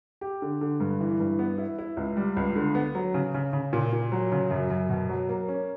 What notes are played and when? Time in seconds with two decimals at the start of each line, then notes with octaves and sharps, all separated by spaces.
0.21 G4
0.42 D3
0.61 D3
0.80 G2
1.01 E3
1.20 G2
1.39 B3
1.58 E4
1.79 E4
1.97 C#2
2.17 G3
2.37 C#2
2.56 D3
2.75 B3
2.95 F#3
3.14 C#3
3.34 C#3
3.53 C#3
3.73 A#2
3.93 A#2
4.12 F#3
4.32 C#3
4.51 F#2
4.70 F#2
4.89 B2
5.09 F#3
5.29 A#3
5.48 C#4